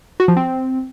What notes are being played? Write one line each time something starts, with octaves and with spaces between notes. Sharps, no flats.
F#4
F3
C4